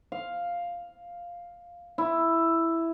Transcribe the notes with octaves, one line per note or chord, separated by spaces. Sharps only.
F5
E4